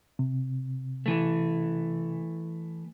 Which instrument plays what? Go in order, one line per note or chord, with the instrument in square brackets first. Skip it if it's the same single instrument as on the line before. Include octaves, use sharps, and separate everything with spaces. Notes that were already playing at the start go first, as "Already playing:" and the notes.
[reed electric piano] C3
[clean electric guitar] E3 A3